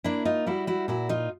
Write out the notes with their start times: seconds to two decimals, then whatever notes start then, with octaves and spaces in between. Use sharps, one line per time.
0.04 A#3 D4 E4
0.25 D#4 F4
0.46 G3 E4 F#4
0.67 E4 F#4
0.88 A#2 E4 F#4
1.09 D#4 F4